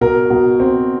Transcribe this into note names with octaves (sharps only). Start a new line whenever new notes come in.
B2 A#4
B2
C4